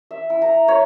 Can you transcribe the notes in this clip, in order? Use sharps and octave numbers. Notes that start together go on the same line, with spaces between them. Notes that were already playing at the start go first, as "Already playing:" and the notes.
E5
E4
A#5
C#5